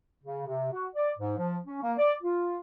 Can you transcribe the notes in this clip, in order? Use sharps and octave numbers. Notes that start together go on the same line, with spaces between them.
C#3
C3
F#4
D5
G#2
F3
C#4
A#3
D5
F4